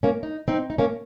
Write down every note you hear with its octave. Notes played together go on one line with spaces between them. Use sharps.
A#3 C#4
D#4
C4 D#4
D#4
A#3 C#4